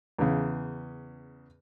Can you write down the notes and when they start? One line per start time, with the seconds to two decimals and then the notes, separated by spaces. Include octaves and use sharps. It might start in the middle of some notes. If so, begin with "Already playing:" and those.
0.18 E2 C#3